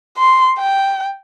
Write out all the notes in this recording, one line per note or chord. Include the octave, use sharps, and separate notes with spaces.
C6
G5